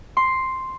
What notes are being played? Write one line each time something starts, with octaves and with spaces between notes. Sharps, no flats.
C6